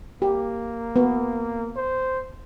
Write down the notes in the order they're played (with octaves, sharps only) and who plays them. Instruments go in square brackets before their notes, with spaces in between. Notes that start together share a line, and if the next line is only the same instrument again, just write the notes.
[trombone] A#3 [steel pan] G4
[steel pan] B3
[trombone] C5